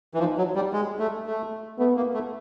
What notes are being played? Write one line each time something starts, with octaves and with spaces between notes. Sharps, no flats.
E3
F3 D#4
F#3
G3
G#3
A3
A3
A3 B3
A#3
A3